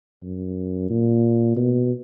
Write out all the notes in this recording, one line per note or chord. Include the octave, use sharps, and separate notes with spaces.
F#2
A#2
B2